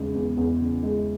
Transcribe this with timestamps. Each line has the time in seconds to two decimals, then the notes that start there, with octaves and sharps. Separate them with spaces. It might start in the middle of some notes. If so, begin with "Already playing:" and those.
Already playing: E2 C#3 G#3
0.15 E2
0.37 E2
0.60 C#3
0.83 G#3